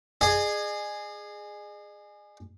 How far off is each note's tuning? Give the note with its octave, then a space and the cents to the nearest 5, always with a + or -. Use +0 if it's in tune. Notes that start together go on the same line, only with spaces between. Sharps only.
G#4 +0 D#5 -45